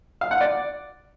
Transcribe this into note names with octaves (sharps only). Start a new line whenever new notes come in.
F5
F#5
D5